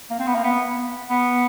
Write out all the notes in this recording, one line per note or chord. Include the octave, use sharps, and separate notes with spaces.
A#3
C4
B3
A#3
B3
B3